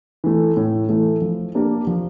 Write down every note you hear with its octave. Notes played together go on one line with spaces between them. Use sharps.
E3 A3
A2
E3 A3
F3
A#3 D4 G4 A#4
F3